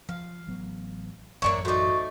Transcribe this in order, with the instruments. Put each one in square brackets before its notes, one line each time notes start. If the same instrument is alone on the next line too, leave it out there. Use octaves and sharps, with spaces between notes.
[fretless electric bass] F3 [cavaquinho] F5
[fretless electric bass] A1 F#3 B3
[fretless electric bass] A1 F#2 [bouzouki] A#3 D4 E5 [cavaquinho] C#5 C#6
[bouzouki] A3 D#4 [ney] F#4 [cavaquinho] C5 D5